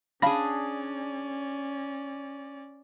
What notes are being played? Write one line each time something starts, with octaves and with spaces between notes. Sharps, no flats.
C#4 D4 G#4 D5 F5 B5 A#6